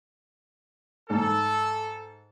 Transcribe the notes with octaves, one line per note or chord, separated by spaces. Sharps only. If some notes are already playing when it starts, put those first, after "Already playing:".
G#2 A4